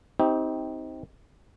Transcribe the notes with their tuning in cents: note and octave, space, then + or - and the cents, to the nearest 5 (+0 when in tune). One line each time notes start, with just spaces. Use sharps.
C4 +0 D#4 +30 G4 +0